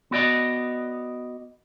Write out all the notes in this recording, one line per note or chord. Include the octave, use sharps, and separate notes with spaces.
B3 F#4 D5 D#5